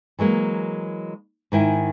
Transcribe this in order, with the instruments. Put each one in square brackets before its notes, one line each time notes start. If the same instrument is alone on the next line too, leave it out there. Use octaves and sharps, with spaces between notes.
[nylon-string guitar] E3 F#3 G#3 A#3
G#2 D#3 E4 G#5